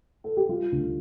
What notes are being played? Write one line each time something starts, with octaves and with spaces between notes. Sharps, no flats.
A4
G4
G3 F4
D2